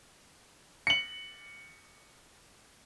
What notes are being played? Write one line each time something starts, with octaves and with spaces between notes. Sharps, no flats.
C#7 F#7